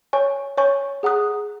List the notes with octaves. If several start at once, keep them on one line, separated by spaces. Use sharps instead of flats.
C#5 G#5 C#6
C#5 G#5 C#6
G#4 F#5 A#5 D#6 F#6